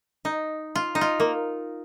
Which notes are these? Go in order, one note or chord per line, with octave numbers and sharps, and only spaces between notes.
D#4
F4
D#4
F4
A#3